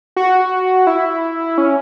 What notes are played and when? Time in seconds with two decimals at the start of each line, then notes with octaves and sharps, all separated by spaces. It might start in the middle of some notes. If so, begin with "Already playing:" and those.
0.16 F#4
0.87 E4
1.58 C#4